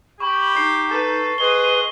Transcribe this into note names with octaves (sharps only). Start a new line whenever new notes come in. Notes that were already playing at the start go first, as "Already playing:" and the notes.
G4 B5 C#6
D#4 C7
A4 B4
G#4 B4 C5 D#5 G7